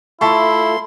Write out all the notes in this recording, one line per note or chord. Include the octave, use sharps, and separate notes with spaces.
A3 E4 F4 A4 E5 A5 C6 C#6